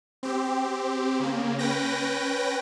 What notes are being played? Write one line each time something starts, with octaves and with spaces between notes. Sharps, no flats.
C4 G4
C#3 A#3
C#4 B4 G5 A#6